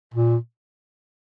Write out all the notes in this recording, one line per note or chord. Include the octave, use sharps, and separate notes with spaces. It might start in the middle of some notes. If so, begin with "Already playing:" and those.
A#2